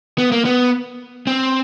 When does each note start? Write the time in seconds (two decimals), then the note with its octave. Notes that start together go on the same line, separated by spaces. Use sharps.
0.18 B3
0.32 A#3
0.45 B3
1.27 C4